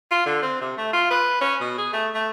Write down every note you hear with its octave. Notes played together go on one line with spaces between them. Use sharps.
F4
D3
C4
C3
A3
F4
B4
C#4
B2
G#4
A3
A3